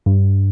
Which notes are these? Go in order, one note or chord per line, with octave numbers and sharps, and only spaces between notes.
G2